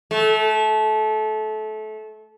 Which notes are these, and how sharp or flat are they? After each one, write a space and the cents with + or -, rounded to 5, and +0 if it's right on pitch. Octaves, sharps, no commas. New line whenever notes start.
A3 -25